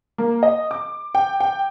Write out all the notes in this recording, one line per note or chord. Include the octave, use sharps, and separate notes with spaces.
A#3
D#5
D6
G5
G5